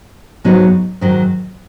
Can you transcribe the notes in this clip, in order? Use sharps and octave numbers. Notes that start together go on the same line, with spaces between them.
G#2 F#3 B3 D#4
G#2 D#3 F#3